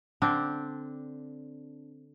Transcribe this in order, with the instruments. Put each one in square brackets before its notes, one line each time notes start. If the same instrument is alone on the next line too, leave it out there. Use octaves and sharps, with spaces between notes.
[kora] D3 C4 D4